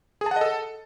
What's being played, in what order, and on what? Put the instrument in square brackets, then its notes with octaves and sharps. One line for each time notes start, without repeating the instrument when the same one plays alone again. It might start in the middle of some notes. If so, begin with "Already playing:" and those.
[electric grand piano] G#4
A5
F#5
D#5
A4